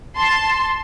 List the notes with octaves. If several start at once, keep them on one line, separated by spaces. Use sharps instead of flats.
A5 C6